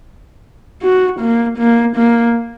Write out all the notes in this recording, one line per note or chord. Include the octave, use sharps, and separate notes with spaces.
F#4
A#3
A#3
A#3